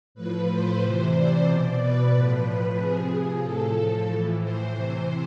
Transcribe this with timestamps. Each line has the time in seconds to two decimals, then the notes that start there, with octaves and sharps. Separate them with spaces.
0.15 A2 F3 B4
0.47 C5
0.80 C3 E3
1.13 D5
1.46 B2 D5
1.79 B4
2.11 A2 F3
2.44 B4
2.77 C3 F3 G#4
3.10 G#4
3.43 A2 F3 A4
4.09 A2 E3
4.41 C5
4.74 C3 E3